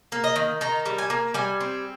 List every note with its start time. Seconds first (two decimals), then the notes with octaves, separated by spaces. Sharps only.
0.12 A#3
0.24 D#5
0.36 D#3
0.61 D#3 A#5
0.86 G3
0.98 G#5
1.10 A#3
1.34 G3 G#5
1.60 C4